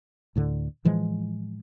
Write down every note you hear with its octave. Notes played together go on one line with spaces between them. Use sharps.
D2 A2 D3
A2 E3 F3 G#3